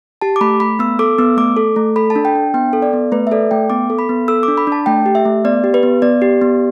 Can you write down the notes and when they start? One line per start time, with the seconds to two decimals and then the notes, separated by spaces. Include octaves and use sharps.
0.21 G4 A5
0.36 D6
0.41 A3 B5
0.60 A3 B5
0.79 B3 E6
0.99 A4 D6
1.18 B3 E6
1.37 A3 D6
1.57 A4
1.76 A3
1.96 A4 B5
2.10 A5
2.16 D4
2.25 G5
2.35 D4
2.54 B3 G5
2.73 A4
2.82 D5
2.93 B3
3.12 A3 B4
3.27 E5
3.31 A4 D5
3.51 A3 G5
3.70 B3 D6
3.90 A4
3.99 B5
4.09 B3
4.28 A4 E6
4.43 D6
4.48 D4
4.57 B5
4.67 D4 A5
4.86 A3 G5
5.06 G4
5.15 E5
5.25 A3
5.45 B3 D5
5.64 G4
5.74 B4
5.83 B3
6.02 B3 D5
6.22 G4
6.42 B3